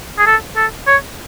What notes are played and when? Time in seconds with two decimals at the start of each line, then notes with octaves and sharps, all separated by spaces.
0.18 G#4
0.27 A4
0.56 A4
0.87 C#5